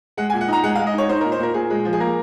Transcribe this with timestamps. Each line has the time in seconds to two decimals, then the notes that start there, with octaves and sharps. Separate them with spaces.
0.17 G#3 F#5
0.30 G#5
0.33 A#2
0.41 F#5
0.48 D#4 A#5
0.63 G#3 F#5
0.75 F5
0.79 G#3
0.87 D#5
0.94 D#4 C#5
1.09 D#4 C5
1.21 A#4
1.24 A#2
1.32 C5
1.39 A#2 A#4
1.54 A#2 G#4
1.70 G#3
1.85 F3
1.93 G#4
2.00 A#3 A#4